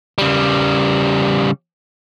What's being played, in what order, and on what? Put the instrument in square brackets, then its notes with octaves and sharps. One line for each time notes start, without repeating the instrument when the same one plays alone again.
[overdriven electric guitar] C#3 G3